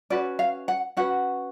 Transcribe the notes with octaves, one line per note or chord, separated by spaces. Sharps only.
C#4 F#4 B4 D5
F5
F#5
C#4 F#4 B4 F#5